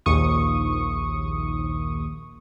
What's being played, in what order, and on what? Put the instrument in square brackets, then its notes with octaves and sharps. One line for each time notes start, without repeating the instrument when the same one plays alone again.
[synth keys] A#1 D#2 C#6 D#6